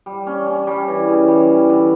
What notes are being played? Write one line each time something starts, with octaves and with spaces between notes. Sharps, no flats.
G3
C#4
C#4
G3
E3
C#3
G3
E3
D3